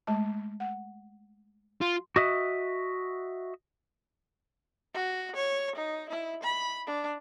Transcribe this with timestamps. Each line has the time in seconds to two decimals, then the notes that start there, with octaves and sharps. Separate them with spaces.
0.07 G#3 A3 A5
0.60 F#5
1.81 F4 C6
2.16 F#4 D#5 E5
4.94 F#4
5.36 C#5
5.76 D#4
6.10 E4
6.43 B5
6.87 D4